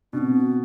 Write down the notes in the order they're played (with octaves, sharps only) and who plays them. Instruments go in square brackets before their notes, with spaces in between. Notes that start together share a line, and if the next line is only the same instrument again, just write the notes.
[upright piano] B2 [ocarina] C4 D4